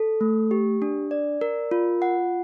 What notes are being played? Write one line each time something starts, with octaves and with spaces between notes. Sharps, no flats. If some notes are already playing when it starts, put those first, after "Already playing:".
Already playing: A4
A3
G4
D4
D5
A#4
F4
F#5